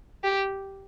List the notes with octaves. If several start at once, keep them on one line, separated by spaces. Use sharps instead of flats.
G4